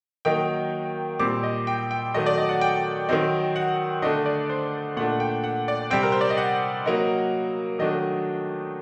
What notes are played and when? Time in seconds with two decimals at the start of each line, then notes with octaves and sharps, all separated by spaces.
0.25 D#3 F#3 A#3 D#4 G5
1.19 A#2 G3 C4 D6
1.43 D#5
1.67 G5
1.91 G5
2.14 D#3 F#3 A3 D#5
2.26 D5
2.37 D#5
2.49 F#5
2.61 G5
3.09 D#3 F#3 C4 D#4
3.56 F#5
4.02 D3 A3 D4 D#5
4.26 D5
4.50 C5
4.97 A#2 A3 D4 F#5
5.20 G5
5.44 F#5
5.68 D5
5.90 C3 G3 C4 G5
6.03 A#4
6.12 C5
6.21 D5
6.30 D#5
6.38 F#5
6.86 F#3 A#3 D#4
7.79 D#3 F#3 A3 D4 D#5